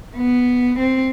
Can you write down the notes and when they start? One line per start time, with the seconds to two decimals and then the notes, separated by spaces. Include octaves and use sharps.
0.16 B3
0.79 C4